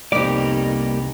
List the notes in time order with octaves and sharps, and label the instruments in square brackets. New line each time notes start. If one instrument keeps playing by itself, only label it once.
[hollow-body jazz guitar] C2 D5 [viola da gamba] F2 B3 D#4 [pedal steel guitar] G3 A#3 G4